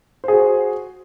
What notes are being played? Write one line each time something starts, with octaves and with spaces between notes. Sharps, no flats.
F#4 G#4 C5